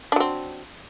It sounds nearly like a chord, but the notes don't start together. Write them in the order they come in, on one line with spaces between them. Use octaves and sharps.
D4 F#3 C4